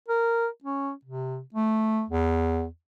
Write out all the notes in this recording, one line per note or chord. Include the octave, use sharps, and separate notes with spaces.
A#4
C#4
C3
A3
E2